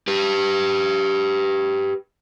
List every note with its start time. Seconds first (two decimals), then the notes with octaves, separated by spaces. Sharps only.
0.08 G4 B4